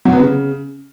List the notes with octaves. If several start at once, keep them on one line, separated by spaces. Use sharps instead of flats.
F#3
B3
C#3